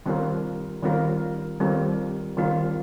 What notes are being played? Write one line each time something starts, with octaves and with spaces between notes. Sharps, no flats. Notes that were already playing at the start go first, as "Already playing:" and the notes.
D#3 G3 C4 F4 A#4
D#3 G3 C4 F4 A#4
D#3 G3 C4 F4 A#4
D#3 G3 C4 F4 A#4